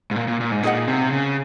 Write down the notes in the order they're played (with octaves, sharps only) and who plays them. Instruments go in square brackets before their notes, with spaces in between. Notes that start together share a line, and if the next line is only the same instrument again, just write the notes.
[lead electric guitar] G#2
A#2
A#2
A#2
G#2
[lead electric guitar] A#2 [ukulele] D#4 G#4 D#5 F#5
[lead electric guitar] C3
C#3